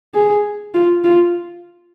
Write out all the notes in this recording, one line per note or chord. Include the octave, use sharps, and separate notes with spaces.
G#4
F4
F4